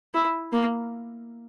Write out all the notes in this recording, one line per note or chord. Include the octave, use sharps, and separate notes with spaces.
E4
A#3